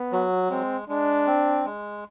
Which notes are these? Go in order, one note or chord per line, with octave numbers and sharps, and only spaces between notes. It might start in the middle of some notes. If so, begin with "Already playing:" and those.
Already playing: B3
F#3
G#3 C4
G#3 D4
C4
G#3